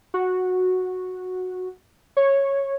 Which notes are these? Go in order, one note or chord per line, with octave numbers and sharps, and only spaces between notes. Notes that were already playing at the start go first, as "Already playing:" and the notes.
F#4
C#5